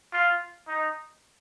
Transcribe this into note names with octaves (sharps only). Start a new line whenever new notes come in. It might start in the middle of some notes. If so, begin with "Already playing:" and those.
F4
D#4